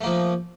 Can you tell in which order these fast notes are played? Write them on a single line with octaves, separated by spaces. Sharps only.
A3 A#3 F3